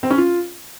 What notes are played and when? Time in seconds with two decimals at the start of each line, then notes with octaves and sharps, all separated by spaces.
0.03 C4
0.10 C#4
0.18 F4